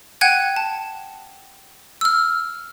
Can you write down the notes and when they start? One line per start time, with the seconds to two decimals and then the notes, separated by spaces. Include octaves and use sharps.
0.21 F#5 G5 F#6 G#6 D#7
0.56 A5
2.01 E6 F6